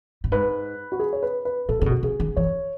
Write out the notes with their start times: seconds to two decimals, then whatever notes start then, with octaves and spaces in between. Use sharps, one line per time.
0.24 A2
0.31 G#2 B4
0.92 F#4
0.99 G#4
1.13 C#5
1.23 B4
1.45 B4
1.69 A2 A4
1.79 C#3 G#4
1.86 B2
1.91 F#4
2.03 C#3 G#4
2.20 D#3
2.36 E3 C#5